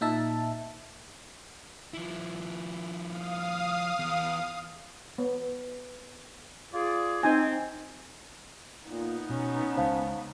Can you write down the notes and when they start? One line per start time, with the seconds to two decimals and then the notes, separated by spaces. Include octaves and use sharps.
0.01 A#2 D#4 E5 A5
1.94 F3 E4
3.08 F5 D#6
3.99 E2
5.18 B3
6.74 F4 G#4 D5
7.23 C4 D#4 G#5
8.87 A#2 B3 D#4
9.30 B2 C#4
9.77 C#2 C5 F5 A5